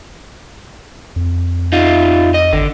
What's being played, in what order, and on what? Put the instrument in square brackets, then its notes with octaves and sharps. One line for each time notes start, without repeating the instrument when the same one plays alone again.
[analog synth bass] F2
[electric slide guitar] D#4 F4
D#5
[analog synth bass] G#1 [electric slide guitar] D3